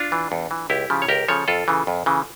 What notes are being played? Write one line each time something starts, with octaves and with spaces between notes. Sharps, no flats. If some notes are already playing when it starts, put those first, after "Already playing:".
Already playing: D4 F4
E3
E2
E3
C#2 E4 G4
C#3 F3
C#5
C#2 G4 A#4
C#3 F3 A4 C#5
F2 F4 A4
C#3 E3
F2
C#3 E3